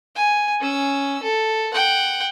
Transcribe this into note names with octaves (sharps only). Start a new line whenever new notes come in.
G#5
C#4 E6
A4
F#5 G5